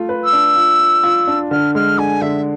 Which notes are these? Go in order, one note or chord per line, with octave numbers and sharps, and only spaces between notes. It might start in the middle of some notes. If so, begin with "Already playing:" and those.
Already playing: A3 F4
B4
E6
D4
F4
F4
F4
D4
D3 F6
G#3 F6
D3 G#5
D3 E5